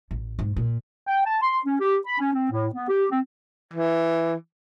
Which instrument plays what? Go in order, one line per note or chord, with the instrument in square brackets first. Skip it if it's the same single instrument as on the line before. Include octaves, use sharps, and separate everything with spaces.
[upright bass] A1
G#2
A#2
[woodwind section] G5
A5
C6
C#4
G4
B5
C#4
C4
A2
B3
G4
C4
[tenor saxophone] E3